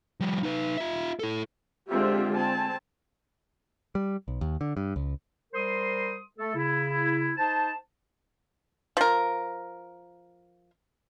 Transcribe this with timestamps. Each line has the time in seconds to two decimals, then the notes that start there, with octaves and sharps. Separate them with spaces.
0.20 F3 G3
0.43 D#4 B4
0.77 F4 E5
1.19 E4 A4
1.88 D3 G#3 C4 F4 G4 E5
2.34 C4 G#5 A5
3.95 G3
4.28 B1
4.41 D#2
4.61 D3
4.77 G2
4.96 C#2
5.53 G3 A#4 C5 C6 D#6
6.37 A3 A4
6.55 C#3 E4
7.37 D#4 C5 A5
8.97 F3 A#4